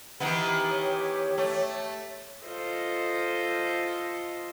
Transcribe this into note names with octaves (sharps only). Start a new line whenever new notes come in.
D#3 E3 B3 G4
C#5
A3
F4 A4 C5 D#5